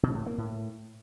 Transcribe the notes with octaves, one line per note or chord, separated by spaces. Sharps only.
B2
A2
A#3
A2